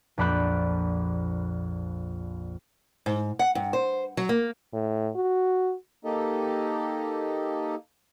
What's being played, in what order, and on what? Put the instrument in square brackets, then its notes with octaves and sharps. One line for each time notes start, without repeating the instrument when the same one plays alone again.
[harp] A#1 F2 D5 B5 F#6 G6
[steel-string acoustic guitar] G#2
F#5
G2
C5
F#3
A#3
[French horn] A2
F#4
[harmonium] A#3 D#4 G4 A4 D#5